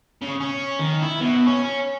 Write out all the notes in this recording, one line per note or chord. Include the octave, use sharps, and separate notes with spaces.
C#3
C#4
D#3
E4
B2
C#4